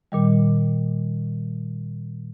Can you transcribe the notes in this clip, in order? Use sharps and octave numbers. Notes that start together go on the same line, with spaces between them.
A#2 D#3 G3